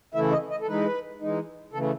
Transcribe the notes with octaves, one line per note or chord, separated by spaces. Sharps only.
C#3 E3 A3 E4 E5
D#5
D#5
A4
E3 G#3 D#4 B4
E3 G#3 D#4
C#3 E3 A3 A4